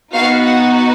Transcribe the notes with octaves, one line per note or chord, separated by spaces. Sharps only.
B3 D#4 F#4 F5
F#5